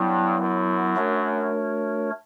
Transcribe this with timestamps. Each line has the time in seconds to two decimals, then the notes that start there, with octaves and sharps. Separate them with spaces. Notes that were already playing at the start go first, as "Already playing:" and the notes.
Already playing: G2 F#3 B3 E4
0.39 F#2
0.96 A3 D4 F#4 A#4 C#5